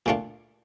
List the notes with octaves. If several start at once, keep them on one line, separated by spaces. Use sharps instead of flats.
A#2 A3 D4 F4